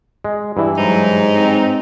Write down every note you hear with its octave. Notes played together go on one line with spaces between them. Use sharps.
G#3
G2 E3 E4
G#2 F#3 D#4
C4